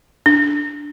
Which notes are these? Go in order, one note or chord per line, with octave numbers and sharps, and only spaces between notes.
D4